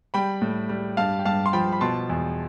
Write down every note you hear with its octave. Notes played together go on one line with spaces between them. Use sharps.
G3 G5 B5
A2
G3
G2 F5 A5
G5
G2 F5 A5
C6
F3 G5 B5
B5
B2 A5 C6
E2